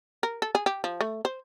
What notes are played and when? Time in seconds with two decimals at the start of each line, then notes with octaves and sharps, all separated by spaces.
0.23 A#4
0.42 A4
0.55 G#4
0.66 G4
0.84 F3
1.01 A3
1.25 C5